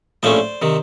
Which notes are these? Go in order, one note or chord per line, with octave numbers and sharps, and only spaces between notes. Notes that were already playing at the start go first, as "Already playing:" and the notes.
A#1 A2 F3 A3 C#4 C5 D5
C3 D#3